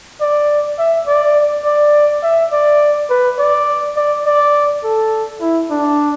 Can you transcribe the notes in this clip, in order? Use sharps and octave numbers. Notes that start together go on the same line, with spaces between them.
D5
E5
D5
D5
E5
D5
B4
D5
D5
D5
A4
E4
D4